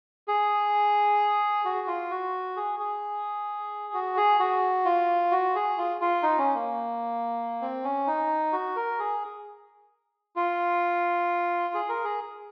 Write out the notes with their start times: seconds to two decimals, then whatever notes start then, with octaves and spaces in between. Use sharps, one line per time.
0.28 G#4
1.65 F#4
1.87 F4
2.11 F#4
2.57 G#4
2.79 G#4
3.94 F#4
4.17 G#4
4.39 F#4
4.85 F4
5.32 F#4
5.55 G#4
5.78 F4
6.01 F4
6.23 D#4
6.38 C#4
6.54 A#3
7.61 C4
7.84 C#4
8.07 D#4
8.52 F#4
8.76 A#4
8.99 G#4
10.36 F4
11.74 G#4
11.89 A#4
12.04 G#4